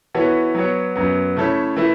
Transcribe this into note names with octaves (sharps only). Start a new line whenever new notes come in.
E3 B3 F#4 A4 C#5
F#3 B3 F#4 C#5
F#2 F#3 B3
C#3 A3 E4 A4 C#5
E3 A3 E4